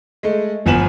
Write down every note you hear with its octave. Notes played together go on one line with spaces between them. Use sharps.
G#3 A3
G1 F3 B3 G#5 E7 F#7